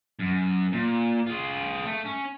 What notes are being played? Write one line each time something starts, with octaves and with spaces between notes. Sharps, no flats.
F#2
A#2
F4 G#4
A3
C#4